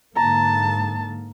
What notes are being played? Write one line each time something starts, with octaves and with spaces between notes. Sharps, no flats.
G#2 D3 A#3 A5 A#5